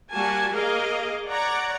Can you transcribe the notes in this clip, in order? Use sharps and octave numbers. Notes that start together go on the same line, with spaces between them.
G3 A#3 F#4 G#5 A5
A#3 G#4 A#4 D#5 F5
C#5 D5 F#5 A#5